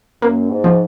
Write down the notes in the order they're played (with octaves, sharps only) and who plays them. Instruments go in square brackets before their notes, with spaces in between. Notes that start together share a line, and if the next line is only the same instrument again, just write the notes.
[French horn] F#2 [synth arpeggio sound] A#3
[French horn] G#2
[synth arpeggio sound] F3